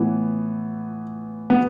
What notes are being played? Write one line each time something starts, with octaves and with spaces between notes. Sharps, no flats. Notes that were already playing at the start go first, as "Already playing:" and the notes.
Already playing: A2 E3 B3
B3